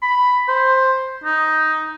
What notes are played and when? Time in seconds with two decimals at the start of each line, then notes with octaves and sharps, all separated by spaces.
0.02 B5
0.48 C5
1.24 D#4